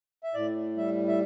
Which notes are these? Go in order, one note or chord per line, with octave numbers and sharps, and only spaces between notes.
E5
A2 D5
G3 E5
E5